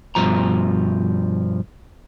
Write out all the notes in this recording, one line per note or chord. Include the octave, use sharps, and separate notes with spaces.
G2 B2 F3 A#5